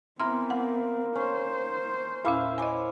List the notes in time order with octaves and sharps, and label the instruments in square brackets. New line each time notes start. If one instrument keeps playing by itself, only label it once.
[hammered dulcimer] E3 A#4 [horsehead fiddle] B3 C4 [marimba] C6 F6
[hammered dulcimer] A#3 [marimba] F#5
[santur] C#4 [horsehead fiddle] C5
[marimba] E2 A#2 C#4 [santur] E4 E5 F5
[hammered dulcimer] C5 C#5 D6 [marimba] D#5 G#5